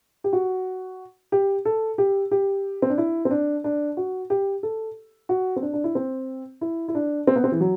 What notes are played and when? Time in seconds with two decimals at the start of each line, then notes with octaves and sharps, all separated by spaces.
0.24 G4
0.33 F#4
1.32 G4
1.65 A4
1.98 G4
2.31 G4
2.82 C4
2.90 D4
2.98 E4
3.25 C4
3.31 D4
3.64 D4
3.97 F#4
4.30 G4
4.63 A4
5.29 F#4
5.56 C4
5.62 D4
5.73 D4
5.84 E4
5.95 C4
6.61 E4
6.88 E4
6.95 D4
7.27 C4
7.36 B3
7.44 C4
7.52 E3
7.60 F#3